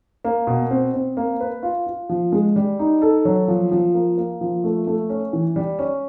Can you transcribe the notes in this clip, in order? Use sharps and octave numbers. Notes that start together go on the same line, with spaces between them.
A#3
B2
C4
C4
A#3
B4
F4
F4
F3
G#3
G3
D#4
A4
F#3
F3
F3
A#3
A#3
F3
A3
A3
C#4
E3
G3
C#4